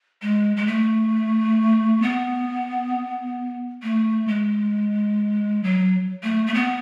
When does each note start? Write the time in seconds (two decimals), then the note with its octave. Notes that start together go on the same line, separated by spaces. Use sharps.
0.22 G#3
0.56 G#3
0.66 A3
2.02 B3
3.82 A3
4.27 G#3
5.63 F#3
6.23 A3
6.46 A3
6.54 B3